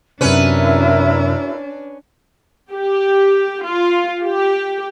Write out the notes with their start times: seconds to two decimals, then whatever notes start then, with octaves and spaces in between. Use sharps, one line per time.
0.21 F#2 C3 C#4 D4 E4 F#4 A#4 B4
2.71 G4
3.65 F4
4.22 G4